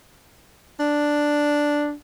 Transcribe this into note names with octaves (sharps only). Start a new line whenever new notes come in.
D4